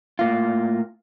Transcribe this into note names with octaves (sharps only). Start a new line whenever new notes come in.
A2 A#3 F4